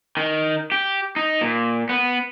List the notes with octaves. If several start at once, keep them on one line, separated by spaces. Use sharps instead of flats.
D#3
G4
D#4
A#2
B3